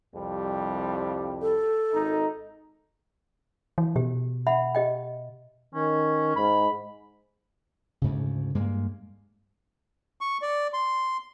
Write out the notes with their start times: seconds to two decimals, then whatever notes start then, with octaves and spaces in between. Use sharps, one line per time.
0.14 C2 F2 G3
1.42 A4
1.93 G#1 D#4
3.78 E3
3.96 B2 G4
4.47 E5 F#5 B5
4.75 G4 D#5 G5
5.75 D#3 C#4
6.36 G#2 B5
8.02 D2 G#2 C#3
8.55 G2 G#3 A#3
10.21 C#6
10.42 D5
10.73 C6